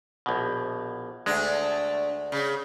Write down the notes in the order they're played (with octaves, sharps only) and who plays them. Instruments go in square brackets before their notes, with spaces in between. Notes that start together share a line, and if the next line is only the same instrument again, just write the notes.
[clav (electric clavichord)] A#1 B2
[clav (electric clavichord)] D2 G#3 [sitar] A3 D4
[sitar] C#3